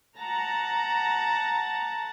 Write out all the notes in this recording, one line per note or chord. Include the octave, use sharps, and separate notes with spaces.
F#5 A5 A#5